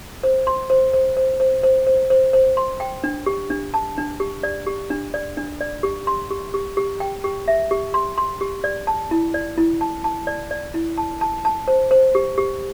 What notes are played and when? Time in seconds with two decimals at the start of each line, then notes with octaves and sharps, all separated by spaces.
0.23 C5
0.47 C6
0.70 C5
0.93 C5
1.17 C5
1.40 C5
1.63 C5
1.87 C5
2.10 C5
2.33 C5
2.57 C6
2.80 G5
3.04 D4
3.26 G4
3.50 D4
3.74 A5
3.98 D4
4.20 G4
4.43 D5
4.67 G4
4.90 D4
5.14 D5
5.37 D4
5.61 D5
5.83 G4
6.07 C6
6.30 G4
6.54 G4
6.77 G4
7.00 G5
7.24 G4
7.48 E5
7.71 G4
7.94 C6
8.18 C6
8.41 G4
8.64 D5
8.87 A5
9.11 E4
9.34 D5
9.58 E4
9.81 A5
10.04 A5
10.27 D5
10.51 D5
10.74 E4
10.98 A5
11.21 A5
11.45 A5
11.68 C5
11.91 C5
12.15 G4
12.38 G4